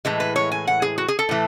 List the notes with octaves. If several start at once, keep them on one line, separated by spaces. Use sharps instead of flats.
A2 E3 G#3
B4
C#5
G#5
F#5
G#4
F#4
G#4
A4
A2 E3 A3